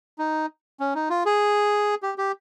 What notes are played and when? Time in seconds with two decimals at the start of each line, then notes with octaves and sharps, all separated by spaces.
0.18 D#4
0.80 C#4
0.95 D#4
1.10 F4
1.26 G#4
2.03 G4
2.18 G4